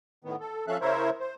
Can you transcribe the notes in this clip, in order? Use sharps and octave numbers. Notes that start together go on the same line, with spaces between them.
A2 D#3 B3
A4
F3 C#4 A4 E5 F5 F#6
C#3 E4 A#4 C5 C#5 E5
C5